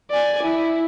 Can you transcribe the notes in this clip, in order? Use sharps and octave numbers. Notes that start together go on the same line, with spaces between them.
D5 G#5
E4